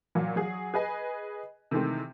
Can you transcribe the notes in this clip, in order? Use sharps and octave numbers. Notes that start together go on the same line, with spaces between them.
A#2 F#3
F#3 G#4
G#4 B4 D#5 G#5
C3 D#3 E3 G#3 A3 C4